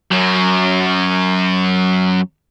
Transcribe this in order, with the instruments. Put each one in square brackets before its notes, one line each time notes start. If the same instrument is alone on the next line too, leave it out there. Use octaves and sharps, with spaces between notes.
[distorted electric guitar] F#2 F#3